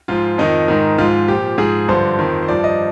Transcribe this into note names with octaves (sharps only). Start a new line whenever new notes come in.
G#2 F3 F4
F2 D#3 D#4
G#2 D#3
G#2 F3 F4
A#2 F3 G4
G#2 F3 G#4
G2 D3 F3 C5
F2 D#3
C5
G2 F3 D5
D#5